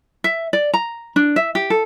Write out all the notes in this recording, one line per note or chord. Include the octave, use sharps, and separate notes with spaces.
E5
D5
A#5
D4
E5
G4
A4